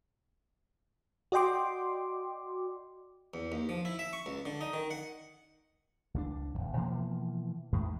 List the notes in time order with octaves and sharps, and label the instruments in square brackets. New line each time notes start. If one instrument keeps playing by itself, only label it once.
[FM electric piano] F#4 D5 D#5 G5 C6 D6
[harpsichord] E2
D#2
F3
E4
E5
C#6
C#2
D3
D#4
D#3
F#5
[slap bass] C#2 F#3 D4
D#1 D#2
B2 E3 F3 A#3
E2 A2 D#3 G#3